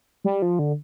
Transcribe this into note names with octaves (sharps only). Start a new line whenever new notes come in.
G3
F3
D3